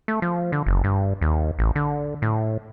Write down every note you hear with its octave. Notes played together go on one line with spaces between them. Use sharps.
A3
F3
D3
F#1
G2
D#2
A1
D3
A2